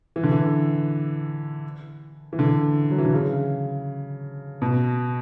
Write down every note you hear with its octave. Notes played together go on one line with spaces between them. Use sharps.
E3
D3
E3
E3
D3
F#3
E3
D3
C#3
B2